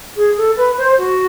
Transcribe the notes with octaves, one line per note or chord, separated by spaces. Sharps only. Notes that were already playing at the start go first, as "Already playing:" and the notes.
G#4
A4
B4
C5
F#4